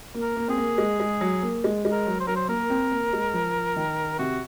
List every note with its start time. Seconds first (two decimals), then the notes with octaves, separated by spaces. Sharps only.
0.14 A#3
0.22 A#4
0.36 A#3
0.48 C4 G#4
0.58 A#3
0.78 G#3
1.00 G#3
1.21 F#3
1.42 A#3
1.64 G#3
1.85 G#3
1.92 A#4
2.06 F#3
2.20 C5
2.27 F#3 A#4
2.36 C5
2.48 A#3 A#4
2.70 C4
2.92 A#3
3.13 G#3
3.34 F3
3.76 D#3
4.19 C3 F#4